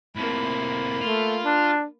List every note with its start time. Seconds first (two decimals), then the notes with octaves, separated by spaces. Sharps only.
0.16 A2 C3 A#3 B5
1.01 A3 F4
1.44 D4